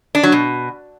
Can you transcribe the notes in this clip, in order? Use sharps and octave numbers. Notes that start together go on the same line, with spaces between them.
D4
F#3
B2